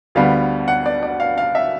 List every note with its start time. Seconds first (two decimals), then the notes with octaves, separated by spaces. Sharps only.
0.15 D2 D3 G3 B3 F5
0.68 F#5
0.86 D5
1.03 D5
1.20 F5
1.38 F5
1.55 E5